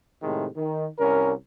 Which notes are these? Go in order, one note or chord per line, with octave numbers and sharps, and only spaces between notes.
A2 C3 D#3 G#3
D#3
C2 C#4 A#4